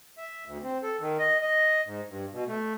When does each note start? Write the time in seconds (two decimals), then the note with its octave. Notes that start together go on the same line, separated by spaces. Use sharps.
0.18 E5
0.46 D2
0.63 C4
0.83 A4
1.00 D#3
1.19 D#5
1.42 D#5
1.86 G#2
2.09 G2
2.33 B2
2.47 A3